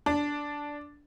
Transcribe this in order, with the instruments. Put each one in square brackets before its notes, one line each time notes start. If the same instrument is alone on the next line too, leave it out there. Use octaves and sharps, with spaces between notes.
[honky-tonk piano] D4